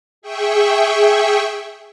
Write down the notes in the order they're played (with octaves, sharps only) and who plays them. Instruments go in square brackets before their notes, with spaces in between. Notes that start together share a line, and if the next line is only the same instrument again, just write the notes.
[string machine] G#4 E5 G5 C#6